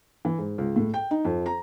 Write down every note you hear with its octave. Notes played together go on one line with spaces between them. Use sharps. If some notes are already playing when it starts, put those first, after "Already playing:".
E3
G#2
C#2
A2
G5
D#4
F2
A#5